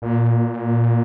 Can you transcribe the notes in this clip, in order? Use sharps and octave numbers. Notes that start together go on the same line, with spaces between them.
A#2